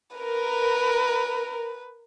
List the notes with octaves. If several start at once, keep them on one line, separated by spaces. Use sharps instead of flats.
A#4 B4